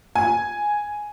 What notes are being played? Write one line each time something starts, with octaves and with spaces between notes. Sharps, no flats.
G#5